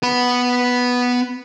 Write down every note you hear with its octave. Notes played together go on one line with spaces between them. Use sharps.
B3 B5